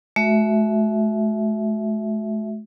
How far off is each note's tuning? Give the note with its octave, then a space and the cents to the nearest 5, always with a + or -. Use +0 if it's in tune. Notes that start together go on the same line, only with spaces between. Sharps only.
A3 -40 F#4 +0 E5 +0